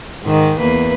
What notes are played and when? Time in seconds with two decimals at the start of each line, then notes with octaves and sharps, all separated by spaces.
0.23 G#2 D#3
0.59 E2 A#3 B4